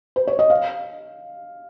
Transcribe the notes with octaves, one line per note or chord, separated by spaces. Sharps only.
C5
C#5
D#5
F5